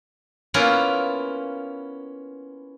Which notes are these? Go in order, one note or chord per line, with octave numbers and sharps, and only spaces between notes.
A#3 B3 C#4 E4 F4